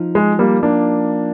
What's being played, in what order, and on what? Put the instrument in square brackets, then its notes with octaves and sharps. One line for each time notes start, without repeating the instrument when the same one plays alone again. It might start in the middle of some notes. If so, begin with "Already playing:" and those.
Already playing: [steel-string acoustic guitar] F3 D#4
[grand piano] G#3
G3 A#3
A#3 D4